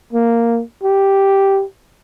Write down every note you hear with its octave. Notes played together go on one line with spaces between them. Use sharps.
A#3
G4